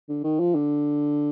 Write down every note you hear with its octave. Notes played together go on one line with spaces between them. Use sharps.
D3
D#3
F3
D3